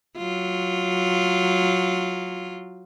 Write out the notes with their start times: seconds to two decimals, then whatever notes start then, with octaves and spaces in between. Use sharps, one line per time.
0.17 F#3 F4